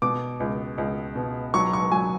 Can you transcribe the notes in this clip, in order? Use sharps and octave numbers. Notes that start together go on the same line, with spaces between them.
B2 D6
C#2
C#2
B2
F#3 C#6
C#6
F#3 G#5